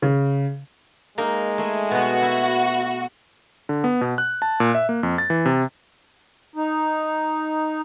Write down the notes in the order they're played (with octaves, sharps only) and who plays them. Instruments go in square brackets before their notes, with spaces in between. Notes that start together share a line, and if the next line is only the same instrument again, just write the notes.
[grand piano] C#3
[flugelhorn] G#3 [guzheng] A#3 D#4 A#4
[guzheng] A3 G#4
[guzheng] B2 B3 [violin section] F#4
[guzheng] E4
[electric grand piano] D3
B3
B2
F#6
A5
A#2
E5
A#3
F2
A6
E3
C3
[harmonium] D#4